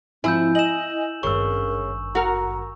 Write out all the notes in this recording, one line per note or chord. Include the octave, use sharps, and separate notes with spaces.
G#2 F3 C4 E4 G#5 E6 G6
D#5 G#5 E7 F#7
G#1 G2 C#3 A#4 C#6 E6
F#4 A#4 A#5